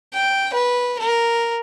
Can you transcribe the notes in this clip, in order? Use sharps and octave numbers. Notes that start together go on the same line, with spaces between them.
G5
B4
A#4